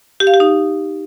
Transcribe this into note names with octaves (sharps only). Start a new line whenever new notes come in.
G4
F5
G4
D#4